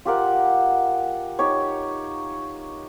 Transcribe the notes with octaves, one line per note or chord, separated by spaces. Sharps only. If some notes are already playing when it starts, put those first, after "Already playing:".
F4 G4 A#4 F#5
D#4 G4 C#5